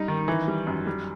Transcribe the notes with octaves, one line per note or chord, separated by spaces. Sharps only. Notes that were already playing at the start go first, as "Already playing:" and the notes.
Already playing: G3 D#4
D#3
E3
G3
F#2
G3